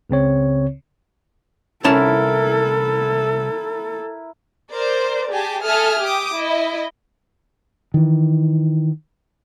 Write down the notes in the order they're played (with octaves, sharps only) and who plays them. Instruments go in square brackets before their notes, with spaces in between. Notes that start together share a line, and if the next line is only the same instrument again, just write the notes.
[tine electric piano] C#2 C#3 C4 C#5
[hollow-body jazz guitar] C2 C#4 A5 [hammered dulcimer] E4 A#4 [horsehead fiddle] A4
[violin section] A#4 C5 D5
G4 G#4 G#5 A5
A4 E5 G#5 D#6 F6
G4 D6 D#6
E4 D#5
[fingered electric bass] D#3 E3